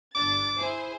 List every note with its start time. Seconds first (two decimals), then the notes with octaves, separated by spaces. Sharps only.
0.15 G1 D4 D6 A6
0.58 E4 G#4 C5